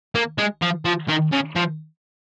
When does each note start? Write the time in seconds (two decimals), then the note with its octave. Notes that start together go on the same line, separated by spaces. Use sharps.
0.15 A#3
0.38 G#3
0.62 F3
0.85 F3
1.08 D#3
1.32 C#3
1.55 F3